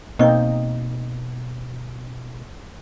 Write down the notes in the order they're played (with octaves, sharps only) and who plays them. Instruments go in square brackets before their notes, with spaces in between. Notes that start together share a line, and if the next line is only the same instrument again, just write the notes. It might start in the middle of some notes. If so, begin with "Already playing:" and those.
[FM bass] B2 [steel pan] A#3 C4 D#4 [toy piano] D#5 C#6